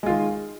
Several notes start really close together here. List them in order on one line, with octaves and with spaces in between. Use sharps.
G#3 F4 D#3